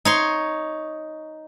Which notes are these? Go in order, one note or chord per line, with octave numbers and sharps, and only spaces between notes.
D#4 C#5 C6